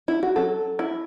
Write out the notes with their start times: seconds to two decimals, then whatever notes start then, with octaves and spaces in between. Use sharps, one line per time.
0.08 E4
0.23 F#4
0.36 F#3 C#4 A4
0.79 E4